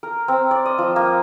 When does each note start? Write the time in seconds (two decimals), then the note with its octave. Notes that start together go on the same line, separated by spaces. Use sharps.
0.03 A#4
0.28 C4
0.51 D5
0.65 D#5
0.78 F3
0.96 A#3